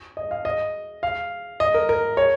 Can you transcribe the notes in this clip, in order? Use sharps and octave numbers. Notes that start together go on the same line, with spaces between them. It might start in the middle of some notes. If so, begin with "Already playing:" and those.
D#5
F5
D#5
F5
D#5
A#4
A#4
C#5